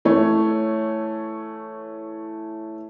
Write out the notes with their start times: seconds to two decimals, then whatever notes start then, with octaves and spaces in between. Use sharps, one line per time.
0.05 E3 A3 C#5